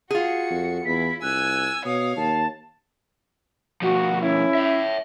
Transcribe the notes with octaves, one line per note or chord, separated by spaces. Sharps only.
F4 F#4 G#4 C#7
F2
E2 E4 B6
C2 G#5 E6 F#6
B2 C#5 F5 D#6
D#2 A5
B2 F3 F#4
C#4 E4
C#5 E5